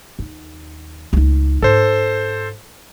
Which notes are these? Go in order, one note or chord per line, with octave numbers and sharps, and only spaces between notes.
D#2
C#2 D#4
G#2 A4 C5